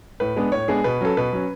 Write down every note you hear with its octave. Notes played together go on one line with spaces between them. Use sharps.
A2 B4
G#3 B3 D4
A2 C#5
G#3 B3 D4 G#4
B2 B4
F#3 C#4 A4
B2 B4
F#3 C#4